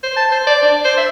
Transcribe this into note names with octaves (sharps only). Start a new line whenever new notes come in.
C5
A5
C5
D5
D4
C5
E5